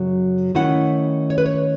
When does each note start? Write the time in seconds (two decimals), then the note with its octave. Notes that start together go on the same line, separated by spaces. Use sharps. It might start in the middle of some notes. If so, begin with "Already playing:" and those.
Already playing: F#2 C#3 F#3
0.55 D#3 A3 C#4 E4 F#5
1.30 C#5
1.38 B4
1.46 C#5